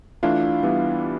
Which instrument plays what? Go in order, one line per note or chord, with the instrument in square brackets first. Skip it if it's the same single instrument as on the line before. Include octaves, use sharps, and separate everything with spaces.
[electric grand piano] E3 A3 E4 [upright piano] D4 F4
[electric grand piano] E3 G3 B3 E4